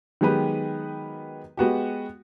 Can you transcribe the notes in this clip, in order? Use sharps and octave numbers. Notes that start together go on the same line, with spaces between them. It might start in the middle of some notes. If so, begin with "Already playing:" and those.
D#3 F#3 G#3 B3 G4 B4
G#3 B3 F#4 G4